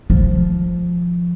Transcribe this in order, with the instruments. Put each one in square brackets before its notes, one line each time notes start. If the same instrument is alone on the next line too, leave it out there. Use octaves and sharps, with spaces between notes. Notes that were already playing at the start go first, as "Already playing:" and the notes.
[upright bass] F3